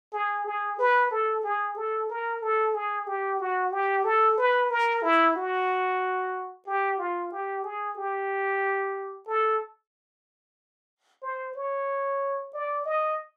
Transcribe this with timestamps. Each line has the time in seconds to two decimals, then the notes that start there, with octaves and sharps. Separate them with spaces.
0.13 G#4
0.46 G#4
0.79 B4
1.11 A4
1.44 G#4
1.76 A4
2.10 A#4
2.42 A4
2.74 G#4
3.06 G4
3.40 F#4
3.72 G4
4.04 A4
4.37 B4
4.70 A#4
5.02 E4
5.36 F#4
6.66 G4
6.98 F4
7.32 G4
7.64 G#4
7.97 G4
9.27 A4
11.22 C5
11.55 C#5
12.54 D5
12.85 D#5